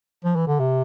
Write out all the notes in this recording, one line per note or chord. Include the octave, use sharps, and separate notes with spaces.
F3
E3
D3
C3